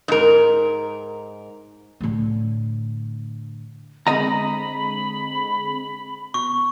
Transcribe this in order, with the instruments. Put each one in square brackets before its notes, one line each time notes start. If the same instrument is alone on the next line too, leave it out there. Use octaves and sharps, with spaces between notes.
[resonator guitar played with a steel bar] G#2 A#4
[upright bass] A2 D3
[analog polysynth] D3 G#3 C4 [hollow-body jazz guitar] D#5 A#5 [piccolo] B5
[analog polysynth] B2 [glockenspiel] C#6